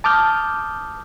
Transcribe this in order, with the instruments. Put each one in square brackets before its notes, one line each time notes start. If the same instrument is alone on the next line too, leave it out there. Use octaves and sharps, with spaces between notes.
[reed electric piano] A5 D6 D#6 F6 G6